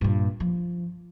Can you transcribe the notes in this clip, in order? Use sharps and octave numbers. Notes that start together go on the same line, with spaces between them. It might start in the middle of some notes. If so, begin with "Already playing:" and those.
G2 A#2
F3